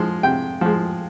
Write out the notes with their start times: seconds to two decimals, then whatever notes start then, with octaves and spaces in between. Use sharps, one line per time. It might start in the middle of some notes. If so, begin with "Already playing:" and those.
Already playing: F3 G#3
0.23 C3 G5
0.61 F3 G#3